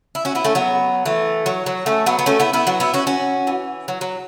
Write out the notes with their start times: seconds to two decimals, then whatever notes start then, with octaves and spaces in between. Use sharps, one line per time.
0.15 E4
0.25 C#4 F#4
0.35 B3 E4
0.45 A3 C#4
0.55 F#3 B3
1.06 E3 A3
1.46 F#3
1.66 F#3
1.86 A3 C#4
2.06 F#3 B3
2.19 B3
2.26 A3 C#4
2.40 B3 E4
2.53 B3 E4
2.67 F#3 B3
2.80 B3 E4
2.94 C#4 F#4
3.07 C#4 F#4
3.47 E3
3.88 F#3
4.01 F#3